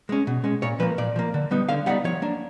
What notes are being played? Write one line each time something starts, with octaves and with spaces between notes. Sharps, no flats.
G#3 C#4
B2
G#3 C#4
A#2 C#5
F3 A#3 B4
A#2 D5
F3 A#3
D3
G3 B3 D#4
D3 F5
G3 B3 D#4 F#5
F3 C#5
A#3 D4